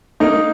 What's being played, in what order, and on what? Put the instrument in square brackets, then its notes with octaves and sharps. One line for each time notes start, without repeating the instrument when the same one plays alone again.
[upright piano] A#3 [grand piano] D#4